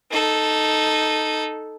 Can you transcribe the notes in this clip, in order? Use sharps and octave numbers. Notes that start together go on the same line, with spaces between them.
D#4 A4